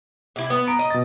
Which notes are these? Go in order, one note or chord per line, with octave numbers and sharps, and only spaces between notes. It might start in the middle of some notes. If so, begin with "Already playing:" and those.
C3 E4
B3
A#5 D7
D#5
B2 A6